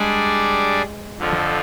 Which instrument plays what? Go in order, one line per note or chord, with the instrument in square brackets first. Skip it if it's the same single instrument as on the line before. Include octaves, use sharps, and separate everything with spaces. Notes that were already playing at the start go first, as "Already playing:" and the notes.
Already playing: [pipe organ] G3 D4 G#4 D5 [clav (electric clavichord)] G#3
[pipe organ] F2 D3 F3